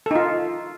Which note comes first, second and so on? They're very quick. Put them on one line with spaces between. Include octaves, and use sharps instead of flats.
A4 D#4 F4